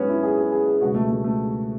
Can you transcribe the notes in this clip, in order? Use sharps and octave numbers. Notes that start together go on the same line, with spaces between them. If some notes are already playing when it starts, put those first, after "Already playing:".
Already playing: G#2 F#3 B3 C#4
E4
G#4
G#4
G#4
G#4
C#2 B2 F#3 F#4
A3
A3
A3